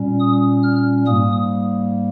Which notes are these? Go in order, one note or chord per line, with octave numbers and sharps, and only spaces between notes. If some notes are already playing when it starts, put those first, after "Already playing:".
Already playing: A#2 G3 C#4
D#6
F6
G#2 G3 A#3 D#6